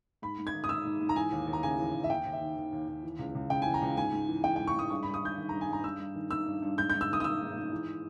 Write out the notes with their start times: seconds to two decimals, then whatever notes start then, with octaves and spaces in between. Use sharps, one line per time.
0.22 G#2 B5
0.38 G#2
0.47 G#6
0.53 D#3
0.64 D#6
0.69 D#3 E6
0.85 G#2
1.01 G#2
1.09 A#5
1.16 E3 G#5
1.32 D#2
1.47 D#2
1.53 A#5
1.63 C#3 G#5
1.78 E3
1.94 D#2
2.04 E5
2.10 D#2 G5
2.26 D#2
2.33 E5
2.41 D#3
2.56 D#3
2.73 D#2
2.88 D#2
3.03 E3
3.19 C#2
3.35 C#2
3.50 C#3 G5
3.62 G#5
3.66 E3
3.74 A#5
3.82 C#2
3.97 G#2 G#5
4.12 G#2
4.28 E3
4.43 E3 G5
4.56 G5
4.60 G#2
4.67 C#6
4.75 G#2 D#6
4.90 G2 C#6
5.03 B5
5.06 G2
5.14 D#6
5.22 D#3 G6
5.38 D#3
5.49 A#5
5.53 G2
5.61 G#5
5.69 G2 A#5
5.84 G2 E6
6.00 G2
6.15 D#3
6.31 D#3 E6
6.46 G2
6.62 G2
6.78 G#2 G6
6.90 G6
6.94 G#2
7.01 E6
7.10 D#3 D#6
7.20 D#6
7.24 D#3 E6
7.41 G#2
7.56 G#2
7.71 E3